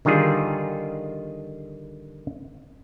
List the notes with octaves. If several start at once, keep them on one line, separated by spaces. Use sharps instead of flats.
D3 D#3 G3 F4 G#4